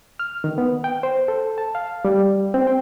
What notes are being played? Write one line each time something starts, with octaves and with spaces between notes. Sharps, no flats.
F6
D#3
B3
G5
C5
A4
A5
F5
G3
C4
G5